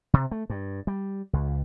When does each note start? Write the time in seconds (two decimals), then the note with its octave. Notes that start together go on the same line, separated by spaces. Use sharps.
0.13 C3
0.31 A3
0.50 G2
0.87 G3
1.33 C#2